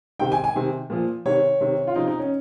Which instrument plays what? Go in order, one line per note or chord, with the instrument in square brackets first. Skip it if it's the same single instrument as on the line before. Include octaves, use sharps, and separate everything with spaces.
[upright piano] C3 D#3 G5
G#5
G#5
C3 D#3
A#2 F3
C3 D#3 C#5
C3 D#3
F4
C3 F3 D#4
D#4
C#4